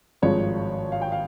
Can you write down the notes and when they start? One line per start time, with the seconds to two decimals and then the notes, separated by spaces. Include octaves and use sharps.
0.22 G#1 G2 F3 G#3 C#5
0.92 F5
1.02 G5
1.12 F5